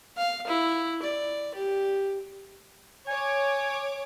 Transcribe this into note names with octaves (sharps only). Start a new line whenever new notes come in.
F5
E4
D5
G4
C#5 G#5 D6